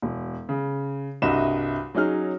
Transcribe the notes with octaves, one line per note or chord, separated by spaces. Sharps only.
E1
C#3
C2 G2 F#4 D#5 E5 E7
F#3 C#4 D#4 G#4 F6